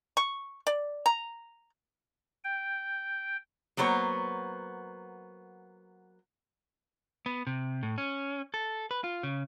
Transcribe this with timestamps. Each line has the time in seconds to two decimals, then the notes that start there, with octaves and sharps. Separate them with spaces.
0.17 C#6
0.67 D5
1.06 A#5
2.44 G5
3.77 F#3 A#3 B3 C5 C#5
7.26 B3
7.47 C3
7.83 A2
7.98 C#4
8.54 A4
8.91 B4
9.04 F4
9.23 C#3